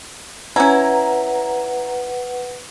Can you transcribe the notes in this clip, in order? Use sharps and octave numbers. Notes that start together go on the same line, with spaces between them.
C#4 E4 B4 F#5 A#5